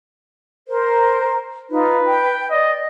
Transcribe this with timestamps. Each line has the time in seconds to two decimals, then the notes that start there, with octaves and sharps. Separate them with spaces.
0.68 A#4 C5
1.70 D#4 F4 B4
2.06 G5
2.51 D5 D#5